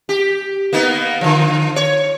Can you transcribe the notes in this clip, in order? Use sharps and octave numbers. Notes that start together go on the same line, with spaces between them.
G4
A#3 B3 D#4
D3 F3
C#5